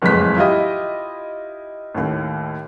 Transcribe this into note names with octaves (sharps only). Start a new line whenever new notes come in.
F#1 F2 A2 G#3 B4 B6
E4 F4 G4 D#5
D#2 A2